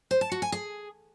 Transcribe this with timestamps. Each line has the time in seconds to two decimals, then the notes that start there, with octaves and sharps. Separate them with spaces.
0.11 C5
0.21 A5
0.32 F#4
0.42 G#5
0.52 G#4